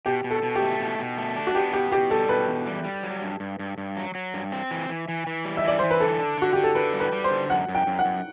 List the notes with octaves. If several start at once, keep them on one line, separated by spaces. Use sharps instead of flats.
B2 G4
B2
A4
B2
G4
A3
B2
B2
A3
D4
F#4
B3 G4
B2 G4
B2 G4
G3 A4
B2 B4
E2
G3
G3
F#3
G2
G2
G2
G2
F#3
F#3
G2
C4
E3
E3
E3
E3
G3
E5
E3 D5
E3 C5
B4
D3 A4
D4
D3 F#4
D3 G4
A4
D3 B4
G3
B4
G3
C5
D3
F#2 F#5
F#2
G5
F#2
F#5
F#2